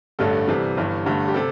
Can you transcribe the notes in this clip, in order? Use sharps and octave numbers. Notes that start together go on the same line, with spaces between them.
A1 G2 D3 A3 A4
C2 C3 E3 G3
G1 G2 E3
G1 G2 D3 A3
G4
C3 A4